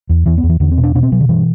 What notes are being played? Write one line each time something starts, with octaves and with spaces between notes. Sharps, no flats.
E2
E2 E3
B3
E2
E3
E2 D3
C4
B2
D4
B2 D4
C4
B2 F#3
D3
G2 E3